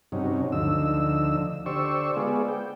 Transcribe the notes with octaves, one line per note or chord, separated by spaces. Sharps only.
G2 C3 F#3 C#4 D#4
D2 D3 F3 D#4 E6
D3 G4 C5 D5 C#6 E6
G#3 B3 F4 G#4 D5
G5